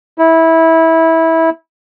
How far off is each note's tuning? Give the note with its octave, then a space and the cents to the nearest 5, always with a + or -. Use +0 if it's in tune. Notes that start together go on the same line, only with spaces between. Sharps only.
E4 -20